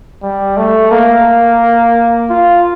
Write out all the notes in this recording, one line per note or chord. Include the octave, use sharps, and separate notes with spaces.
G3
A3
A#3
F4